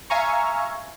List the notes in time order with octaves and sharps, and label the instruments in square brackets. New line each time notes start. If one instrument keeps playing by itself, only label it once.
[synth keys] E5 F5 G#5 A#5 C#6